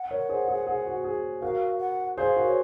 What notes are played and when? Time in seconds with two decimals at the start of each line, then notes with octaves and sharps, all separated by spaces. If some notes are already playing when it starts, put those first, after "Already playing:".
Already playing: F#5
0.11 A#4 C#5
0.29 G#4 C5
0.48 G#4
0.67 G#4
0.86 F#4
1.04 G#4
1.42 F#4 A#4 F5
1.80 F#5
2.17 G#4 C5 F5
2.36 F#4 A#4
2.47 C#5